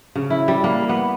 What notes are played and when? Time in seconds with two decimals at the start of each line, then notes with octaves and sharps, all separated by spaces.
0.15 C#3
0.30 E4
0.48 G3
0.64 A#3
0.89 B3